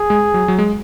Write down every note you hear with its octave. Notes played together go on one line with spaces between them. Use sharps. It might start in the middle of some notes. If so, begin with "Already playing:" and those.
Already playing: G#4
G#3
F#3
F#3
G#3